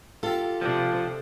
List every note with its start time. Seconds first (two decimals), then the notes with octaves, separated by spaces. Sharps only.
0.23 F4 G4 A4
0.61 C3 F3 D4